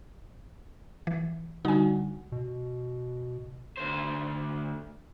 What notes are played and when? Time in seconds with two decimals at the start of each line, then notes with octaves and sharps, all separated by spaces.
1.07 E3
1.65 D3 G3 D#4 F#4 G#5
2.32 B2
3.77 D2 C5